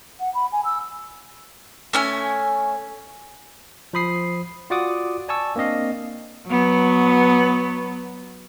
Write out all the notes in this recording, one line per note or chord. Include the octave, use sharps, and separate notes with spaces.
F#5
B5
G#5
E6
A3 C#4 G#5
F3 C5 B5 D#6 C7
F4 F#4 D5 F#5 D6 D#6
D5 G#5 A5 C#6 E6
A#3 C4 D4 D#5 F5
F#3 B3